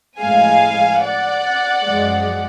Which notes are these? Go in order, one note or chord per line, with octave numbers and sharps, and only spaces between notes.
A2 F3 G#3 F5 G#5
D5 F#5
F#2 F3 G#3